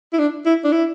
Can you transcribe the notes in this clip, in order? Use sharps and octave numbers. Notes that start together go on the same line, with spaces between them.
E4
D4
E4
D4
E4